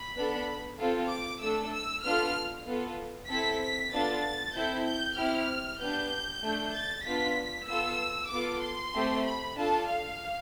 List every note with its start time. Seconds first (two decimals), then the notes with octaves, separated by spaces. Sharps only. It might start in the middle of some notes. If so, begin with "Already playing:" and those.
Already playing: B5
0.16 B3 D4 A4
0.79 C4 F4 A4
1.10 D6
1.41 A3 D4 A4 E6
1.72 E6
2.04 B3 D4 F4 A4 F6
2.67 B3 F4 A4
3.30 C4 E4 A4 B6
3.62 B6
3.93 B3 D4 F4 A4 A6
4.55 C4 E4 A4 G6
4.86 G6
5.17 C4 E4 G4 F6
5.81 B3 D4 G4 G6
6.43 A3 D4 A4
6.74 A6
7.06 B3 D4 F4 B6
7.69 B3 F4 A4 E6
8.31 B3 F4 A4 D6
8.62 C6
8.94 A3 C4 G4
9.26 B5
9.57 D4 F4 A4 A5
9.88 F5